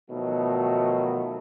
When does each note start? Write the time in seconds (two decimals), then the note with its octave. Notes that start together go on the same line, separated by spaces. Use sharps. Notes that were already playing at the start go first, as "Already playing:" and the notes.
0.11 B2 D#3 F3 F#3 A3